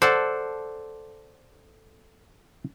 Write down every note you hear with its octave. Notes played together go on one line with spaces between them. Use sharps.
A4 C5 D5 F#5